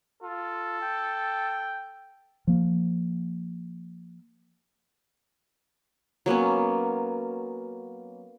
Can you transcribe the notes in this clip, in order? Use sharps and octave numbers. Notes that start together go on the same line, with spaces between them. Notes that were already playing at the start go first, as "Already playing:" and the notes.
F4 A4
G5
F3 A#3
F#3 A#3 B3 C#4